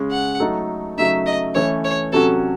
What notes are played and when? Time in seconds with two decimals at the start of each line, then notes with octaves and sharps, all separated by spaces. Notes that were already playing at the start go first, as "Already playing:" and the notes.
Already playing: C#3 G#3 C#4
0.11 F#5
0.40 F#3 A3 D#4 A4
0.98 C#3 F#3 A3 D#4 E5
1.26 D#5
1.55 E3 A3 C#4 C#5
1.84 C#5
2.13 C3 F#3 C#4 F#4 A4